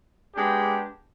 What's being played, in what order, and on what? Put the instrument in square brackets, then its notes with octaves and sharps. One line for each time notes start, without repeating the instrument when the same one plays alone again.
[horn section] G#3 B3 D4 G4